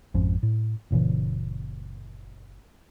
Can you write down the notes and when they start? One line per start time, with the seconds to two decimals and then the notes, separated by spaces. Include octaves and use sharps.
0.14 G#1 F2 F3 C#4
0.43 A2
0.91 F#1 A#2 C#3 E3